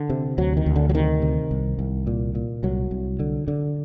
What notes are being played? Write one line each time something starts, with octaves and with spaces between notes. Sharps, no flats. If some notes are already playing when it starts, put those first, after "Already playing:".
Already playing: D3
C3
D2 F#3
D#3
D2
D3
F#3
C3 D#3
C3
C2
C2
A#2
A#2
C2 F#3
C2
D3
D3